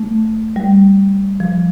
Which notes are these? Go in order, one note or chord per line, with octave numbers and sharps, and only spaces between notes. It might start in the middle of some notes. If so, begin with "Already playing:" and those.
Already playing: A3
G3
F3